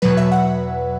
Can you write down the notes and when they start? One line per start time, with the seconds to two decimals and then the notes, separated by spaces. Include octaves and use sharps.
0.02 E2 B2 F#3 B4
0.17 E5
0.32 F#5